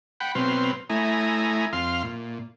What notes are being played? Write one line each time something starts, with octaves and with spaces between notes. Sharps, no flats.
F#5 G5 B5
B2 F#3 C4 B4 C6 F6
A3 E4 G#5 A#5 D#6
F2 F5 C6 F6
A#2